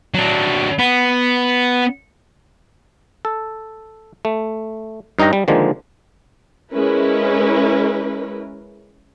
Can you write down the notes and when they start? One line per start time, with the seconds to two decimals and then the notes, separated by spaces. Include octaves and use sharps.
0.14 F#3 D4
0.78 B3
3.25 A4
4.25 A3
5.19 G2 D#4 C#5 G5 A#5
5.33 G3
5.48 D3 D#3 F3 G#3 A#3
6.71 G#3 C#4 E4 A#4 B4